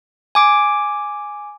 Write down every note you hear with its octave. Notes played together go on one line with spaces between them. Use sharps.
G#5 D6 D7